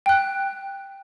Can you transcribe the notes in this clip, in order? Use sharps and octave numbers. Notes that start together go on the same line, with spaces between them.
G5 F#6